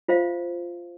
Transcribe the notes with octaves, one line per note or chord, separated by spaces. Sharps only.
F4 C5 E5 F5